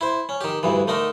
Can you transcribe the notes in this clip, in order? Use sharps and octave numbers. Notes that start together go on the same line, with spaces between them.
E4 C5
C#4
D#3 G4
D2 G2 E3
D3 A3 D#4 A#4